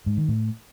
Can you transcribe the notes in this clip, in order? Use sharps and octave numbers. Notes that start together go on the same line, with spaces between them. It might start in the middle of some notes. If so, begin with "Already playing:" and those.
G#2
D#3
A2